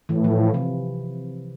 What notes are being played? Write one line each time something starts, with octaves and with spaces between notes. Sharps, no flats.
A2 E3
F3
C3